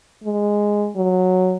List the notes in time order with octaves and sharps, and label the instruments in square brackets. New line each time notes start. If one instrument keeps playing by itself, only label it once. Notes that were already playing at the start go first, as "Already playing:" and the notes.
[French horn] G#3
F#3